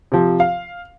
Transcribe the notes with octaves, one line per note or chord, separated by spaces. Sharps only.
C3 F3
F5